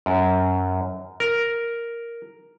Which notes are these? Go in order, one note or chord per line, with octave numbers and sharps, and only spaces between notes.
F#2
A#4